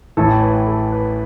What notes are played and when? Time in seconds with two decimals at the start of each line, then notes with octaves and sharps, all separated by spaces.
0.17 A1 A2 E3 A4
0.42 B4
0.67 A4
0.93 B4